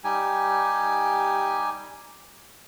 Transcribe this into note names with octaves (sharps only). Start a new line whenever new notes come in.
G3 D#4 G4 G#5